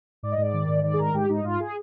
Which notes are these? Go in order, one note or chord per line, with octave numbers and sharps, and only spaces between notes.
G#2 D5
D#5
G#2 D5
D#3
G#2
D#3 D5
G#4
G#2 A#4
G#2 G4
G#2 D#4
G#2 F4
G#4